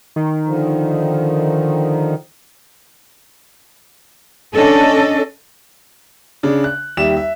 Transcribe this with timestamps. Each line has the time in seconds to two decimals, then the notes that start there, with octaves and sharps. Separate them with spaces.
0.16 D#3
0.45 D3 F3
4.55 C#4 D4 A4 D#5
6.43 C#3 D4
6.64 F#6
6.97 D#2 G3 G4 E5 E7
7.17 E5